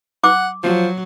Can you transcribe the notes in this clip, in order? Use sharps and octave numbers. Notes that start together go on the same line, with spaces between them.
F#5 D6
F3 F#3